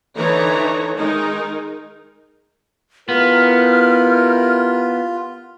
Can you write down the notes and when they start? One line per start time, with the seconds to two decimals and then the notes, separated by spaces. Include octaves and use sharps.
0.15 D3 E3 D#4 C#5 A#5
0.96 D#3 G#3 D#4 A#4
3.09 B3 E4 F4 G4 A#4 F6